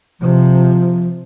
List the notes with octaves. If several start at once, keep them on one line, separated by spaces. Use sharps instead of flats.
C3 F3